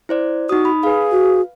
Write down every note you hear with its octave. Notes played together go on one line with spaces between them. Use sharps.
E4 C5 D5
D#4 F#4 D#6
B5
G#4 B4 F5
F#4